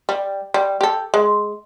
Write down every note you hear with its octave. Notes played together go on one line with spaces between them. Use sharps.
G3
G3
G4 A4
G#3